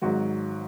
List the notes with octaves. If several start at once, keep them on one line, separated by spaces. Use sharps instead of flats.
G#1 G#2 F#3 F#4